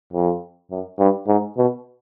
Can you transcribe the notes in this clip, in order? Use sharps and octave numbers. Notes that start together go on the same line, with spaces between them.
F2
F#2
G2
G#2
B2